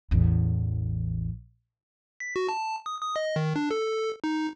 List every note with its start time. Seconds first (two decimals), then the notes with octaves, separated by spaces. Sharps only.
0.11 A1 E2
2.20 B6
2.36 F#4
2.49 A5
2.86 D#6
3.02 D#6
3.16 D#5
3.36 D#3
3.56 D4
3.71 A4
4.24 D#4